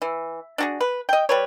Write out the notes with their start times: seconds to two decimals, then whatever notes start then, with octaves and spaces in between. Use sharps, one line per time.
0.02 E3
0.58 D4 F#4 G#4
0.81 B4
1.09 D#5 G5
1.29 G3 B4 C#5